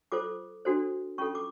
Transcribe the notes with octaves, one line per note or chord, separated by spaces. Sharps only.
F4 A4 C5 D6
D4 F#4 A4 C5
C#4 F4 A4 C#6
D6